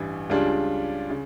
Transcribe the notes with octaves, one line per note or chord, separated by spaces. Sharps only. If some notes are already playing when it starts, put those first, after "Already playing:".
Already playing: A1 G2 E3 G3
C#2 C#3 G3 D4 F4
C#3